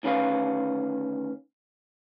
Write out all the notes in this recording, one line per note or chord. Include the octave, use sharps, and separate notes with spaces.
D2 D#3 C#4 B4 F5